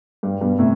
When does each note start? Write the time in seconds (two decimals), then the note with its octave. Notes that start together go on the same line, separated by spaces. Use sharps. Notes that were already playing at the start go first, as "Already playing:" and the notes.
0.23 G2
0.41 G2 B2
0.59 A2 C3